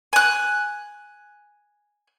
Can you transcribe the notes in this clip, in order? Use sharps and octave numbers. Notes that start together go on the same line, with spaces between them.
G#5 F#6